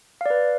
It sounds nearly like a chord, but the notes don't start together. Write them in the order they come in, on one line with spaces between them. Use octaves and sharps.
F5 D5 B4